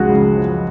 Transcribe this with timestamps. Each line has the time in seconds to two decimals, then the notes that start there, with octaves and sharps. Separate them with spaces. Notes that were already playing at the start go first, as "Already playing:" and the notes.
Already playing: C#2 F3 G#3 F#4 G#4
0.10 C#3
0.37 F3